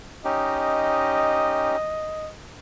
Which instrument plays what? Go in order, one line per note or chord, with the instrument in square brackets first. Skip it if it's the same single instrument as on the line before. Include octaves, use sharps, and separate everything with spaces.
[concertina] C#4 D#4 G4 [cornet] D#5